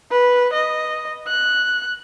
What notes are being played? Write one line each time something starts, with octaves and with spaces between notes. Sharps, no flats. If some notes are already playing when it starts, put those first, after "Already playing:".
B4
D#5
F#6